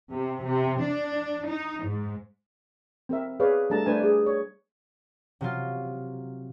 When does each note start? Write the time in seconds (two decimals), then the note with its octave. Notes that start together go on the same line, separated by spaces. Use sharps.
0.11 C3
0.44 C3
0.81 D4
1.48 D#4
1.84 G#2
3.09 C4 A#4 E5
3.40 G#4 B4 C#5 D5 F5
3.70 G3 A3 D4 A4 A5 A#5
3.86 A3 D4 B4 C5 G#5
4.00 G#4 D5
4.27 C#5
5.41 C3 F#3 F4